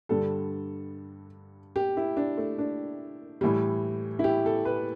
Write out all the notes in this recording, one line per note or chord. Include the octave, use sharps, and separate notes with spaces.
G2 D3 G3 A4
G4
E4
D4
A3
D4
A2 E3 G3
E4
G4
A4
B4